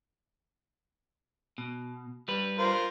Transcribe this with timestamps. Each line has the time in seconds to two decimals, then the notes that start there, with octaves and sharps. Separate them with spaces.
1.58 B2
2.28 G3 B4
2.58 F4 A#4 C5